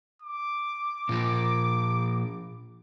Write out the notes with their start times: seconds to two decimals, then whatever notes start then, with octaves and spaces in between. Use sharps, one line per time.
0.22 D6
1.09 A#2 F3